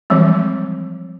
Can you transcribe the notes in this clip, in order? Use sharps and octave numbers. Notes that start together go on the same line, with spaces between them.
E3 F3 G3 G#3 C4